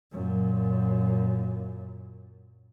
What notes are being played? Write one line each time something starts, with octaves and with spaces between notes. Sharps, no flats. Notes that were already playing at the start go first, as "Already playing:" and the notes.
F#2 A#2